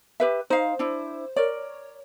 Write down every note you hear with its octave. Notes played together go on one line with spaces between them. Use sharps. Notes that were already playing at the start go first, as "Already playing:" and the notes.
G4 B4 E5
D#4 C5 F5
D4 E4
A#4 C#5 D5